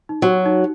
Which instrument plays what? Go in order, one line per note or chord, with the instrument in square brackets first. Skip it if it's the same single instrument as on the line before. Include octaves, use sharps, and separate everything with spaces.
[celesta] D#4
[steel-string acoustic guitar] F#3 [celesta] F#4
[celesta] D#4